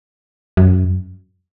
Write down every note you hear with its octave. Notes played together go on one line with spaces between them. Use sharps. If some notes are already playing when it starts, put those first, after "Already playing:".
F#2